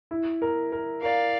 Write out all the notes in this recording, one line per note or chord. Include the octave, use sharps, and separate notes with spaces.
E4
A#4
A#4
A#4 D5 F5